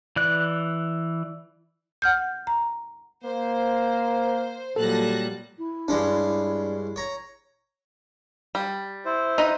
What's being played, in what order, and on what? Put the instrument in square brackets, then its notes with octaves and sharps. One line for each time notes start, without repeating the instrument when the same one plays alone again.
[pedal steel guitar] E3 D5 F#6
[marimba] F#5 F6 G6
A#5
[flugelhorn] A#3 [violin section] C5
[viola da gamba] A#2 F#3 G3 [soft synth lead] A4 [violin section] A5 F#6 A#6
[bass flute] E4
[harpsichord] G2 G#3 C#4 [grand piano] D4
[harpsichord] C#5 A#5
[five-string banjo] G3
[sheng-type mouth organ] E4 C5
[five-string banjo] D#4 B4 D#5